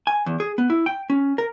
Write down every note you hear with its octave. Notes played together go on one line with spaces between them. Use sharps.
G#5
E2
G#4
B3
E4
G5
C#4
A#4